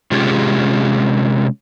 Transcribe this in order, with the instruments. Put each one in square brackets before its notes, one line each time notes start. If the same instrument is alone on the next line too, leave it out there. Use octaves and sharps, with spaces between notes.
[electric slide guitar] C3 G#3 C#4 F4 G4 G#4